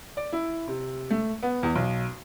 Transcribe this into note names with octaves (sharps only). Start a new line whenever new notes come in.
D5
E4
C3
A3
B3
E2
B1